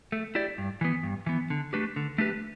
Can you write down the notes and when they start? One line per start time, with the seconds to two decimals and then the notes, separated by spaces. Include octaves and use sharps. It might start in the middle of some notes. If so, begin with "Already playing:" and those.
0.12 A3
0.35 E4 G4 D5
0.58 G2
0.81 E3 B3
1.03 G2
1.26 E3 B3
1.50 D3
1.73 A3 D4 G4 B4
1.96 D3
2.18 A3 D4 G4 B4